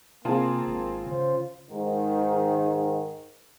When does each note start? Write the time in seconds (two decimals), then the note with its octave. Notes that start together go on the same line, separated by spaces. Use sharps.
0.25 C3 A#3 C4 F4 G#4 A5
0.67 G#1
1.06 C#3 C5
1.70 G#2 D#3